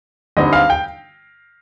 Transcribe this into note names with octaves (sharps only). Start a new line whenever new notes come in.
G2 D3 G3 C4 D#4 D#5
F5
G5